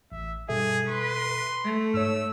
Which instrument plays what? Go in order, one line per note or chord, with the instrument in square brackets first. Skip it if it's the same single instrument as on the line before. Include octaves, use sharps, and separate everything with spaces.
[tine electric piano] A1 [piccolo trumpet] E5
[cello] G2 [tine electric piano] B2 A4 E5 [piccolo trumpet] G#4
[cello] B4 [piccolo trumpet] C6
[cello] A3
[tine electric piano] G#2 C#5 [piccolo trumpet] E6